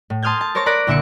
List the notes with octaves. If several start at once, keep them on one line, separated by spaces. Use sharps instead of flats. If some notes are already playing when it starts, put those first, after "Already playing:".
A2
A5 C6 D#6 F6 G6 G#6
A5
A#4 C5 C#5 C#6 A6 A#6
A#4 D5 B5 D6 F#6 A#6
C2 A#2 D3 E5 D6 C#7